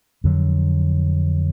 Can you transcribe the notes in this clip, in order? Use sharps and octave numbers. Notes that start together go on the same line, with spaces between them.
F2 D3 F#3